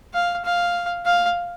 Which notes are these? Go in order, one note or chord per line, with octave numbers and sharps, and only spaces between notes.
F5
F5
F5